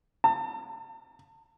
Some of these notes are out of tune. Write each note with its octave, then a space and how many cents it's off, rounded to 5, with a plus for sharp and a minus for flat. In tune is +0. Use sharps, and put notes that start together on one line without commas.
A5 +40